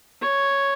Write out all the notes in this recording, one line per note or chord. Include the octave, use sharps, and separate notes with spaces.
C#5